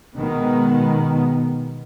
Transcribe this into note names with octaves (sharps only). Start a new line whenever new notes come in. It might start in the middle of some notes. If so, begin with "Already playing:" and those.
B2 D#3 G#3 B3